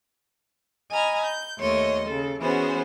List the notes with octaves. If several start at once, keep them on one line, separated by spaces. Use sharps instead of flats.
D#5 G#5 A#5 B5 F6
G6
D#2 A3 C#5 D#5 C6
C#3 A4
E3 B3 C#4 F#4 G#4 C5